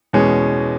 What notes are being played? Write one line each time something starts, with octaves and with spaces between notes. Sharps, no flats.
E2 B2 G#3 C#4